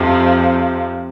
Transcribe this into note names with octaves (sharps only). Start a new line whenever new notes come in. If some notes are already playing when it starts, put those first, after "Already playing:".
Already playing: F2 C3 F3